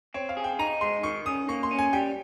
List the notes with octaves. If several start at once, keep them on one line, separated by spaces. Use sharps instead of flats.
C4 C#5
F5
G#4
G5
D#4 A#5
G#3 C6
D#3 C#6
C#4 D#6
A#3 C#6
C6
C#4
G#5
G3 G5